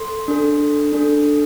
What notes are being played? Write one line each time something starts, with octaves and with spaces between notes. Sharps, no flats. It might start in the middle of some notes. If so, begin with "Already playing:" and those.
Already playing: A4 C6
D4 A4
D4 A4